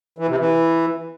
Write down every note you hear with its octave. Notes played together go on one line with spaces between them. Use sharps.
E3
C3
E3